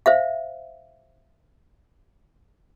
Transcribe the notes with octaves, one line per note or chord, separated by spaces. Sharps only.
C5 E5 F5